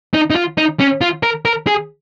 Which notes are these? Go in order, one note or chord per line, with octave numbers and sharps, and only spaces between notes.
D#4
D#4
F4
D#4
C#4
F4
A#4
A#4
G#4